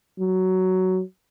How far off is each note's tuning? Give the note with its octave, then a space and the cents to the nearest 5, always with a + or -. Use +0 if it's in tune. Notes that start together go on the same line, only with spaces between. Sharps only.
F#3 +10